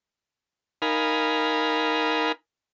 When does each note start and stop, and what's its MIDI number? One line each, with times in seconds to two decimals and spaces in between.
0.82 2.32 63
0.82 2.32 70
0.82 2.32 77
0.82 2.32 80
0.82 2.32 83